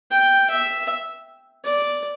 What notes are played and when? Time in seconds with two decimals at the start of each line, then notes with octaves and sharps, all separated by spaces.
0.11 G5
0.50 E5
1.65 D5